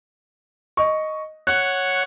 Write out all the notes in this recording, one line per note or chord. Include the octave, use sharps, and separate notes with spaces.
D#5 C#6
C#5 F#5 C#6 F#6